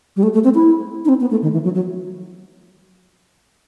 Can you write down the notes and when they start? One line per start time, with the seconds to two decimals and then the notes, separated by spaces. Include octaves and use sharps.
0.16 G3
0.23 A3
0.34 A3
0.44 C4
0.55 E4
1.05 D#4
1.09 C4
1.21 B3
1.31 A3
1.42 D#3
1.53 E3
1.64 F#3
1.75 F#3